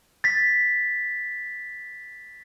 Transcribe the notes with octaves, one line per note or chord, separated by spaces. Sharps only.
A6 B6